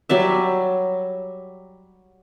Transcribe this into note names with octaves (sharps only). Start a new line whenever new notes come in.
F#3 G3 D5 E5